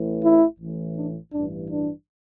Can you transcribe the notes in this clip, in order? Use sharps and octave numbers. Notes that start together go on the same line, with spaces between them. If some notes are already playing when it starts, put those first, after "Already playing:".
Already playing: A1 A2 E3
E4
A1 A2 E3
D4
A1 G2 E3 D4
D4